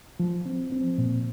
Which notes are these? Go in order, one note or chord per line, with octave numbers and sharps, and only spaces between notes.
F3
C4
C4
A#2